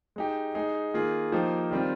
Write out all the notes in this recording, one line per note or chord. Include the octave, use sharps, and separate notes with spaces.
G#3 D#4 G4
G#3 D#4 G#4
D#3 A#3 F4 G#4
F3 A#3 D#4 G4
D#3 G3 C4 F4